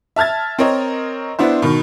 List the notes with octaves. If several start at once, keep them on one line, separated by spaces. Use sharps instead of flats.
E5 A5 F6 G#6 A6
C4 A#4 C#5 D#5
B3 D4 E4 C5
B2 D#3